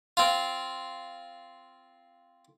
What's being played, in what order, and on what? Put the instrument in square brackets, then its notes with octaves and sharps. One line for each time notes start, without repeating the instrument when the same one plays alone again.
[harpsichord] C4 F4